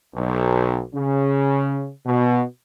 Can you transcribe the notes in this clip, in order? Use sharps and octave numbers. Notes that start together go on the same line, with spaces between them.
B1
C#3
B2